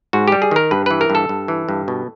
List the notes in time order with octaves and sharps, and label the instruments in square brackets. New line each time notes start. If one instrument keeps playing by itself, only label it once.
[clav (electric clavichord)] G#2 F#4
G3 G4
G#4
D#3 A#4
G2 B4
E3 B4
A#4
G2
A4
G2
E3
G2
B2